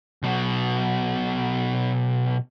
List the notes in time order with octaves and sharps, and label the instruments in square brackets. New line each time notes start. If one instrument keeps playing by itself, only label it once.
[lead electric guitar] B1 B2